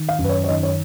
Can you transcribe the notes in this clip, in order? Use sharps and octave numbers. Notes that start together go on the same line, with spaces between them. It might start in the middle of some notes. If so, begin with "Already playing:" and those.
Already playing: D#3
F5
F#2
B4
C#5
C#5
D#3 D#5
C#5